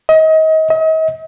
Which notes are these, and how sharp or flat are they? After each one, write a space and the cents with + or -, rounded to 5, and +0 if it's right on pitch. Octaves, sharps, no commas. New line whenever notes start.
D#5 +30
D#5 +40